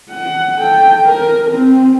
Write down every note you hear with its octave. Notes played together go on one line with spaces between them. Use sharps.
F#5
A4 G5
A#4
C4